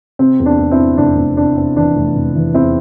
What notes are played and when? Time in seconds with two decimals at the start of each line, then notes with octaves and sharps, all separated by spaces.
0.19 C3 C4
0.40 E2
0.46 D4
0.59 E2
0.71 C4 E4
0.78 C3
0.98 F1 D4
1.17 F1 C4
1.37 C3 D4
1.57 C3 C4
1.77 E3 D4
1.96 F1
2.16 F1
2.35 E3
2.54 E2 C4 E4